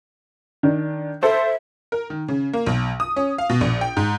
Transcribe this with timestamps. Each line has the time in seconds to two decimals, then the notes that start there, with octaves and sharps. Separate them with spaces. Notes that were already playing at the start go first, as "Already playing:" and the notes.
0.63 D#3 D4
1.23 A4 C5 E5
1.92 A#4
2.10 D#3
2.28 C#3
2.53 A#3
2.66 B1
3.00 D#6
3.16 C#4
3.38 F5
3.50 B2
3.61 A#1
3.81 G5
3.97 G#2